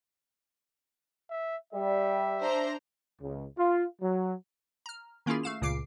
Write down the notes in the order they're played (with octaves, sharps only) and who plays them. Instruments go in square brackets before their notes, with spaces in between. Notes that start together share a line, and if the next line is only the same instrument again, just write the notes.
[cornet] E5
[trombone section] G3 [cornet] E5
[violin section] D4 C5 A#5
[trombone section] C#2
F4
F#3
[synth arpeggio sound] A#5 F6
D#3 A#3 C#4 E4 F4 G#4
A3 F5 E7
C#2 A#2 C#3 D6 C7 D7